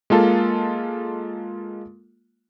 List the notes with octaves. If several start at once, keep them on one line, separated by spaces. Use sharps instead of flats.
G#3 A#3 F4 A4